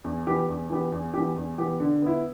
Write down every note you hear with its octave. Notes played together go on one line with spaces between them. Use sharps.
E2
E3 B3 G4
E2
E3 B3 G4
E2
E3 B3 G4
E2
E3 B3 G4
D3
B3 E4